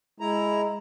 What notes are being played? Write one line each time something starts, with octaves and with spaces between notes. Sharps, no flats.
G#3 E4 A#5